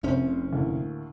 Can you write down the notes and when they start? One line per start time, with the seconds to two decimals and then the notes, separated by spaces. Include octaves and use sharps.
0.03 F1 C2 C4 C#4 C5
0.53 D2 A2 A#3